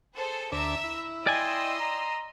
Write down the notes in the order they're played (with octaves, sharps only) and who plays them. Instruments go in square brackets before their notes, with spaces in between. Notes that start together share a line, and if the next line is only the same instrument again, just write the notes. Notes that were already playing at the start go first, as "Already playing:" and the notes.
[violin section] G#4 A4 C5
[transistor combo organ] D2 D4 [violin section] E5 A#5 E6
[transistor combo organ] E4
[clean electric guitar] D5 G#5 [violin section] D#5 C6 E6 [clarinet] G5
[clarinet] A#5